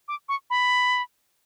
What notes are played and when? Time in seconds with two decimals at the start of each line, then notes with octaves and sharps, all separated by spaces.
0.08 D6
0.29 C#6
0.50 B5